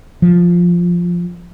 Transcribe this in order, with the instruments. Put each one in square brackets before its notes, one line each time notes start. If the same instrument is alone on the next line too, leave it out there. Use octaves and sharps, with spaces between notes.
[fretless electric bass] F3